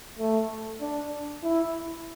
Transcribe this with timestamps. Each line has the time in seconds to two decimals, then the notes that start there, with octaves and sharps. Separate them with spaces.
0.19 A3
0.80 D4
1.43 E4